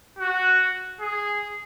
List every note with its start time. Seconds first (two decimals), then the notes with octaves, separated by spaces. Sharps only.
0.19 F#4
1.01 G#4